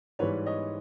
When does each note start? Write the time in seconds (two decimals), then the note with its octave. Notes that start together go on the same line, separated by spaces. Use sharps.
0.19 G#2 E3 G3 B4 C#5
0.46 C#5 D#5